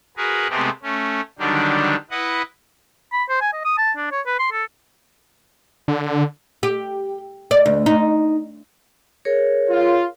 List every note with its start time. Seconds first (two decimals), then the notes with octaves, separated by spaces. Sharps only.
0.17 F#4 G#4 A#4 B4
0.50 C3 G#3 A3 B3 C4 G4
0.83 A3 C#4
1.39 D3 D#3 F#3 G3 D4 G4
2.11 E4 B4 D#5 F#5
3.13 B5
3.29 C5
3.41 G#5
3.53 D#5
3.65 D#6
3.78 A5
3.97 D4
4.11 C#5
4.26 B4
4.39 C6
4.52 A4
5.88 D3
6.63 G4
7.51 D5
7.66 D2
7.86 D#4
9.25 G#4 A#4 C#5
9.69 F4